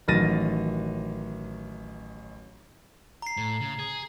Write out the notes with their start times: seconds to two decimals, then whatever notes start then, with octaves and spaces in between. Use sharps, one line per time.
0.08 A1 D#3 F#3 A6 A#6 D#7
3.22 A#5 C7
3.37 A2
3.60 C#3
3.79 G#4